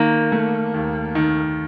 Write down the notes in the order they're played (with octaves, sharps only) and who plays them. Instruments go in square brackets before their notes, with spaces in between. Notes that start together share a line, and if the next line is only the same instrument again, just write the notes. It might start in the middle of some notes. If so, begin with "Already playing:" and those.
Already playing: [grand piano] D#3 [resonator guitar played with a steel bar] A#3
[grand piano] A3
D#2
D#3